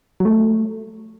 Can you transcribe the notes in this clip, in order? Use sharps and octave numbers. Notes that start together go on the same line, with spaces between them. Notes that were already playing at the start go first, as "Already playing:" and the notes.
F#3
A3